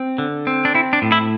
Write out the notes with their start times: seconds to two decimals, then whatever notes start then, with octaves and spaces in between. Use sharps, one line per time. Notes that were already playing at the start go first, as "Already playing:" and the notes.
Already playing: C4
0.18 D3
0.47 C4
0.65 D4
0.74 C4 E4
0.93 D4
1.02 A2
1.12 E4